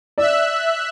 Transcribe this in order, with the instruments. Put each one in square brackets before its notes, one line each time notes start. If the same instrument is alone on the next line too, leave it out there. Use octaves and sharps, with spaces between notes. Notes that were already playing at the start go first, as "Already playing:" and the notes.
[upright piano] D5 [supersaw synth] E5 E6 F#6